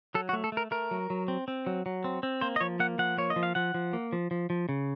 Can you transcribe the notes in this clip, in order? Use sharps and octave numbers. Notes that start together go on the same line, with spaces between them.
F#3 A4
F#4
A3
A4
A3
A#4
A3 A#4
F#3
F#3
C4
C4
F#3
F#3
C4
C4
A#3 C5
D#5
F3 C#5
A#3 F#5
F3 F#5
A#3 C#5
D#5
F3
F5
F3 F#5
F3
A#3
F3
F3
F3
C#3